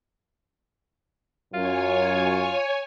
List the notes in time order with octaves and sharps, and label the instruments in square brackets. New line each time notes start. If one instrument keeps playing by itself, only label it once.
[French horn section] F#2 [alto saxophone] F4 [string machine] C#5 G#5